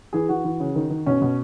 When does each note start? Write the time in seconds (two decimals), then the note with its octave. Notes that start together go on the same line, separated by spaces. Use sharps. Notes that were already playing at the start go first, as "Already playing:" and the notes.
0.13 E3 G#4
0.29 E3 F#4
0.44 E3
0.60 C#3
0.76 D#3
0.90 D#3
1.06 B2 C#4
1.22 B2